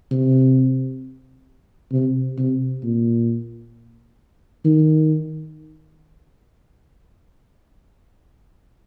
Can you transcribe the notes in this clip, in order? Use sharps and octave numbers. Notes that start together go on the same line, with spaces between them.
C3
C3
C3
A#2
D#3